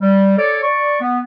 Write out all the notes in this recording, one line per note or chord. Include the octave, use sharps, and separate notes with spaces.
G3
A4 C#5 D5
D5 C#6
B3